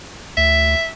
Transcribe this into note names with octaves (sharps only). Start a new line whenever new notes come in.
D2 E5